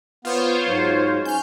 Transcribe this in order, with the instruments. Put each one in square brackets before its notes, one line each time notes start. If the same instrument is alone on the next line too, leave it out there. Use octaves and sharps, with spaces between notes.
[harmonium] B3 [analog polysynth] F4 C5 C#5
[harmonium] G#2 F#3
[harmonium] C#4 [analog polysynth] F6 G6